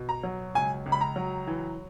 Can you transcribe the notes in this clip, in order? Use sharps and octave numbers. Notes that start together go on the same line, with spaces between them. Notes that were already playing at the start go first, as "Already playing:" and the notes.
Already playing: B2
A#5
F#3
C#2 G#5
C#2
B5
A#5
F#3
E3